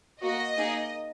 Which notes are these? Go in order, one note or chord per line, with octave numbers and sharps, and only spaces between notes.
A#3 F#4 D#5
A#3 D#4 G#4